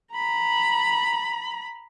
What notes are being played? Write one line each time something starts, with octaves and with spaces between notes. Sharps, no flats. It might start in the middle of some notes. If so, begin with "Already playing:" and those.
A#5 B5